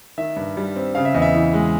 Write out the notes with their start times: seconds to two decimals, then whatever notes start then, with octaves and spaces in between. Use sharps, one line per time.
0.18 D#3 E5
0.36 G2
0.57 G3
0.76 C4
0.95 C#3 F5
1.05 E5
1.14 E2 D#5
1.22 E5
1.35 E3
1.53 G#3